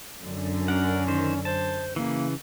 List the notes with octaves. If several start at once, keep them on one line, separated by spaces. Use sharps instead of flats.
F#2 D3
C#4 A#4 F#5
D#3 C5
C5 A5
C#3 E3 A#3